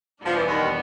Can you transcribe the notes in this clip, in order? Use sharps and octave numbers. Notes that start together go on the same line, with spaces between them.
E2 B2 F3 G3 B3 D4
E3
D#2 D#3